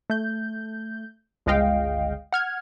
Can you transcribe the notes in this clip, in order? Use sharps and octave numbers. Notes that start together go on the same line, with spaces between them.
A3 G6
G1 C#2 G#3 D#5 F5 G5
F#5 F6 G#6